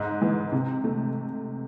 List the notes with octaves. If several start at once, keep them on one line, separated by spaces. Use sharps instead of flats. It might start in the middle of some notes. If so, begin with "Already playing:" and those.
Already playing: G#2 F#6
E3 G#3
C3
A3